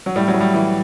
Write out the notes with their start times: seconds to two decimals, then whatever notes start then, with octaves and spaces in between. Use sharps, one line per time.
0.06 F#3
0.16 A2 G3
0.28 F#3
0.34 A2
0.41 G3
0.54 E3